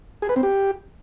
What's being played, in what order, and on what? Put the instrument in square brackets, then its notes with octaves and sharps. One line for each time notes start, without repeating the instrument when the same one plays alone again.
[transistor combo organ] G#4
B4
C4
G4